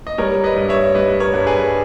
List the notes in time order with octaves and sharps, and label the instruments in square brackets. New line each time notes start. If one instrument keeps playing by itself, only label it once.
[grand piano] D#5
G3 A#4 C#5
B4 D#5
G2
C#5 E5
G3 B4 D#5
A#4 C#5
G2
G#4 B4